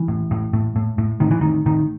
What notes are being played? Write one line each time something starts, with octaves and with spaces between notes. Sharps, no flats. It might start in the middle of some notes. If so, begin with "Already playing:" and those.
Already playing: E3
A2
A2
A2
A2
A2
A2 D#3
E3
A2 D#3
A2 D#3